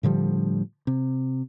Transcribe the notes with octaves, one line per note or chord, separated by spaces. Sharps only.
A2 D3 F3 G3
C3